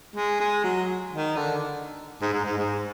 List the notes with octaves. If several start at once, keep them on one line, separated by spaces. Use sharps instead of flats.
G#3
G#3
F#3
D#3
D3
G#2
G#2
G#2
G#2